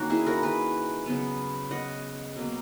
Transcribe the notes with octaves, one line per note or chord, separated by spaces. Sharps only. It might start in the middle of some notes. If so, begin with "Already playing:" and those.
Already playing: D#3 A#3 C#4 F#4
E4 G#4
F#4 A#4
G#4 B4
C#3 F#3 B3
D#5 F#5
B2 F#3 A#3